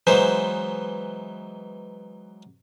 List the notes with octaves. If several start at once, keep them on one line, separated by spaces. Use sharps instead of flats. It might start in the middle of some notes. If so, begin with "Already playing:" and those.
E3 F#3 G#3 B3 D#4 C5